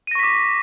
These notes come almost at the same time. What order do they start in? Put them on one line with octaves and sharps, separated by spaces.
D#7 A#6 C#6 B6 D6